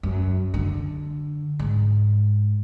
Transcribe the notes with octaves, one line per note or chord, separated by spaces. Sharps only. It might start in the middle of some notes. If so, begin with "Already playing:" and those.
F#2
D3
G#2